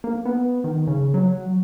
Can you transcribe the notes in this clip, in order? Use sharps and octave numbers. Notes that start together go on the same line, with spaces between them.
A#3
B3
D#3
C#3
F#3